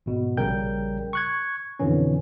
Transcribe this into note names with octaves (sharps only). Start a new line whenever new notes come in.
G#1 B2
A#1 C#3 G3 A#4 G5 G6
C#6 F#6 G#6
F2 B2 D3 E3 C#4